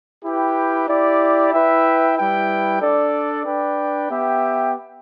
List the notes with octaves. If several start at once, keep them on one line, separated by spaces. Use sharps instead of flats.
E4 G4 B4 G5
E4 G4 D5
E4 B4 E5 G5
G3 E4 B4 G5
D4 A4 D5
D4 B4 D5 G5
B3 G4 E5 G5